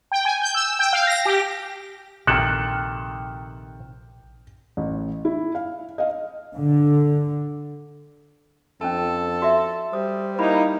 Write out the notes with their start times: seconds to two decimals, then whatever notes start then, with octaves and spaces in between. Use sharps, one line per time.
0.12 G5
0.25 G#5
0.42 G6
0.55 E6
0.79 G5
0.93 F5
1.07 A#6
1.25 G4
2.27 A#1 C3 D#3 A4 G5 F6 F#6
4.77 A1
5.25 E4
5.55 F5
5.98 D#5 F5
6.54 D3
8.81 F2 C#4 D4 A4 A5
9.42 F#4 D5 E5
9.93 G3 C5 D#6
10.39 A#3 D#4 E4 B5